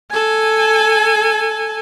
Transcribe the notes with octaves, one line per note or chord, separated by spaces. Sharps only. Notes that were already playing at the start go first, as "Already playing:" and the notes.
A4 G#5